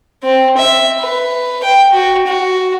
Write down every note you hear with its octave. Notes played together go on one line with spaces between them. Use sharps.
C4
E5
B4
G5
F#4
F#4